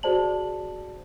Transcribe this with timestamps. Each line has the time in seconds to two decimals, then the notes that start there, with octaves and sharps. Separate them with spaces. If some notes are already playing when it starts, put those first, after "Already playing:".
0.03 F#4 G#4 C5 D5 A5 F#7